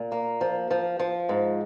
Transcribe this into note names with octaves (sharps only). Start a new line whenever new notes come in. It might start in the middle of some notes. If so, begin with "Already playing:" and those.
Already playing: A#2
A#3
F3
F3
F3
G#2